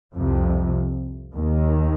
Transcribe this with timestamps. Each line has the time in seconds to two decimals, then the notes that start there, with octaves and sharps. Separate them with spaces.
0.15 C2 F2 C3 F3
1.35 D#2 D#3